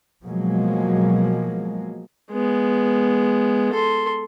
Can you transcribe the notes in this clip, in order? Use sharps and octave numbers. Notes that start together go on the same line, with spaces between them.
B2 F3 F#3 G#3 A#3
G#3 B3
A4 C6